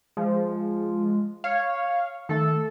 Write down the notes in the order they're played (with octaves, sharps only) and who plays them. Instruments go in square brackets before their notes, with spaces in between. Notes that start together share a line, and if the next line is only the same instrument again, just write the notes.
[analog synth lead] F3 [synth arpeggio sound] G#3
[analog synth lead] C#5 [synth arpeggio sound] F5
[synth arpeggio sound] D#3 A3 [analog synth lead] A4